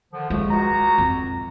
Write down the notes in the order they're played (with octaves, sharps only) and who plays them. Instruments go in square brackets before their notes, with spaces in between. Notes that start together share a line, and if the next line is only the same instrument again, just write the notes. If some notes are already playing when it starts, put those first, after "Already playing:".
[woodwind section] D3 D#3 F3
[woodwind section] D#2 A#2 A3 [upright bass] G#3
[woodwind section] C#2 F#4 A#5
[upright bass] F2